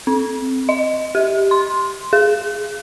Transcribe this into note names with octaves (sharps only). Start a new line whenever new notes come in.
C4
D#5
G4
C6
G#4